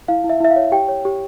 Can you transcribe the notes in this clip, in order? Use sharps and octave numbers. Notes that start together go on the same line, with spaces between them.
E4 F5
E4
E5
E4 E5
F5
C#5
G4 G5
C#5
G4